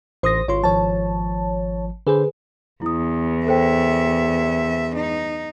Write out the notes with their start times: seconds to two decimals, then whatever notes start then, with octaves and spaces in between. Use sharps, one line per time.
0.23 A1 C5 C6 D#6 A#6
0.48 G#1 F4 C#5 C6
0.64 G#1 F3 C#5 A5
2.07 D3 G#4 B4 C5
2.82 E2 E4 D#6
3.47 A4 C5 E5 G5
4.96 D#4